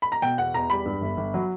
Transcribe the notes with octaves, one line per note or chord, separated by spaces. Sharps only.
B5
A#5
B2 G5
E2 F#5
E2 A#5
G3 B5
G2
G1
G1
F#3